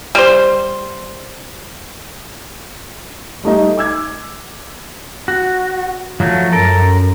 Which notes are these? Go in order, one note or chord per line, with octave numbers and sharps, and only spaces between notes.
G3 C5
G3 A3 D#4 D#5
D6 E6 G#6
F#4
F3 F#3 A3
F#2 A4 A#4